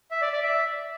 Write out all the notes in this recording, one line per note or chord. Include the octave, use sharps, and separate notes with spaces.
E5
D5
D5
E5